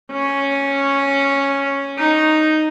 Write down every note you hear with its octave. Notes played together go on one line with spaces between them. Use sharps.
C#4
D#4